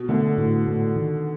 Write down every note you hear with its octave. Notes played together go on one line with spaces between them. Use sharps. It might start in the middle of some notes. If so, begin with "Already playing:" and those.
Already playing: B2
D3 A3
A2
A2
D#3